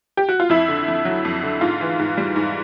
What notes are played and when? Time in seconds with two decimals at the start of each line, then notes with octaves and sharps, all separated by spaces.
0.17 G4
0.29 F#4
0.40 F4
0.49 F2 E4
0.68 D3
0.88 F2
1.05 F#3
1.25 F2
1.43 D3
1.61 G#2 F4
1.81 E3
1.99 G#2
2.18 G3
2.36 G#2